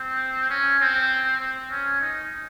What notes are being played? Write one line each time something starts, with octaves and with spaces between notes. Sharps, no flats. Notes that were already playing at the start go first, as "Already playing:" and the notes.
Already playing: C4
C#4
C4
C4
C#4
D#4